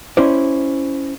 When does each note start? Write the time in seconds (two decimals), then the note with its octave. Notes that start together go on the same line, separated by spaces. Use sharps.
0.17 C#4 E4 C5 D5